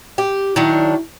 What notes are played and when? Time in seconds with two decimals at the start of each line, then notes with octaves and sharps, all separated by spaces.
0.18 G4
0.56 D#3 F#3 D4 E4